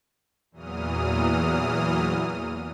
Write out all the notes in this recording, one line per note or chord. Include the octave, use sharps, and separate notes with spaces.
E2 A#2 E3 F#3 D#6 F6